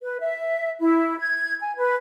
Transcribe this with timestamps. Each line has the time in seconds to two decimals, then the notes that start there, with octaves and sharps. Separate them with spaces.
0.02 B4
0.20 E5
0.80 E4
1.20 G#6
1.60 G#5
1.77 B4